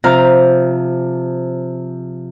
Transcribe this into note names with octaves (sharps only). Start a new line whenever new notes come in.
C3 F3 F5 A#5